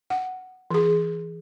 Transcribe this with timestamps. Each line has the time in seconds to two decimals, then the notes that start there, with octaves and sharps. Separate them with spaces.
0.10 F#5
0.71 E3 G#4